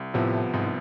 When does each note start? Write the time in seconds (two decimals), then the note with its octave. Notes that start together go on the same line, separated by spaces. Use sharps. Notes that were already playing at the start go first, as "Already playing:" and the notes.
Already playing: C2
0.14 A2 C3 F3 B3
0.53 C2 G#2